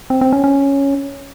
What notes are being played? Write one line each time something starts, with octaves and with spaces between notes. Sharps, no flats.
C4
C4
C#4
C#4